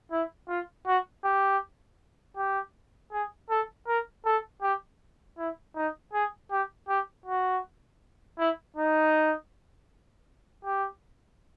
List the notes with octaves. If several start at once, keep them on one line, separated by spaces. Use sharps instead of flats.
E4
F4
F#4
G4
G4
G#4
A4
A#4
A4
G4
E4
D#4
G#4
G4
G4
F#4
E4
D#4
G4